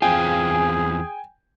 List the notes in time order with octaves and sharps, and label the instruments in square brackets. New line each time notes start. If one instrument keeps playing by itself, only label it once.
[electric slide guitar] E2 C4 F4 [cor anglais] G#4 [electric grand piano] G5 G#5